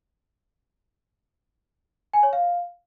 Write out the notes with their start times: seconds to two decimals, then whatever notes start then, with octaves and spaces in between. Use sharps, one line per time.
2.14 G#5
2.23 C#5
2.33 F5